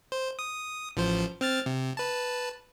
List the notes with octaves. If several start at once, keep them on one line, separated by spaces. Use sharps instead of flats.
C5
D#6
A1 F3 C5
C4 F6 A6
C3
B4 A5